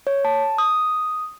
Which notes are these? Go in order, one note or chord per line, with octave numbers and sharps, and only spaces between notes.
C#5
A5
D#6